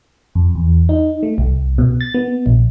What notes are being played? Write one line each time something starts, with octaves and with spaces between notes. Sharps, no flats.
F2
E2
D#4
A3
C2
B2
A6
B3
A#1